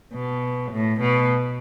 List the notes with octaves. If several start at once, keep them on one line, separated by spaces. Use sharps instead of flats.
B2
A2
B2